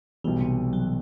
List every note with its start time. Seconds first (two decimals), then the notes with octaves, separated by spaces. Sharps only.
0.24 B1 B2 E3 G3
0.41 C3
0.73 F#3